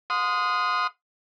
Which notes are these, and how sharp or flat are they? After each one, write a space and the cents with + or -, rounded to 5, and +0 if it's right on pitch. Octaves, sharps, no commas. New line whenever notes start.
F#5 -45 C6 -20 D#6 +0